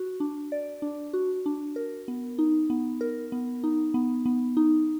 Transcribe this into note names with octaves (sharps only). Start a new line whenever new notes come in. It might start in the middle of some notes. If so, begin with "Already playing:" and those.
Already playing: F#4
D4
D5
D4
F#4
D4
A#4
B3
D#4
B3
A#4
B3
D#4
B3
B3
D#4